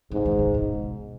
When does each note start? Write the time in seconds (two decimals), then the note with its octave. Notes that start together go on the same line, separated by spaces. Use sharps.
0.11 G#2 C#3
0.26 D#3
0.39 C#3
0.54 B2